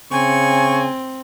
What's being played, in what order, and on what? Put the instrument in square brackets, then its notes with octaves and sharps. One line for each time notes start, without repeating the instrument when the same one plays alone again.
[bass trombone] C#3 [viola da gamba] C4 [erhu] G#5 [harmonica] C#6